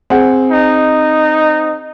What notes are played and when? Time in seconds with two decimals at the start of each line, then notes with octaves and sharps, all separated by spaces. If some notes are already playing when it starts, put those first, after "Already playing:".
0.10 C4 G#4 F#5
0.51 D#4